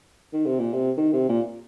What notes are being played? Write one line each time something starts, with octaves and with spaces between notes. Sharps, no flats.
D#3
C3
A#2
C3
D#3
C3
A#2